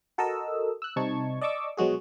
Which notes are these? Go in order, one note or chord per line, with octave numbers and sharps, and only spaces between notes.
F#4 A4 A#4 D#5 E6
E6 F#6
C3 G3 D#4 A5 C#6 G#6
D5 D#5 A5 C#6 D6 E6
B2 F#3 G#3 F#4 G#4